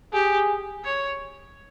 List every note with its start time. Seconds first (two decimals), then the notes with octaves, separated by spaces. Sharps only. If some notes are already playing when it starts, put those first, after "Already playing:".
0.13 G4 G#4
0.84 C#5